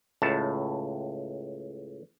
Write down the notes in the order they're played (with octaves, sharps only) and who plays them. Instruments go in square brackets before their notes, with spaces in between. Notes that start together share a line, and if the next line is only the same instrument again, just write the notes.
[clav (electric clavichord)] C#2 A2 A5